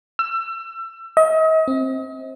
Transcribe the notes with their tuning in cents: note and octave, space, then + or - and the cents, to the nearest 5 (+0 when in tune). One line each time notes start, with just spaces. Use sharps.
E6 +30
D#5 +40
C4 +15